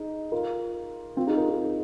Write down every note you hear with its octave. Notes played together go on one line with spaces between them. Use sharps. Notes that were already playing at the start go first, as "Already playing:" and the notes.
Already playing: D#4 G#4
F4 A#4
C4 F4
D#4 G#4
F4 A#4
D#4 G#4